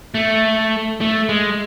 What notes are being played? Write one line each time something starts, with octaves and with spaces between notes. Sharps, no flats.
A3
A3
G#3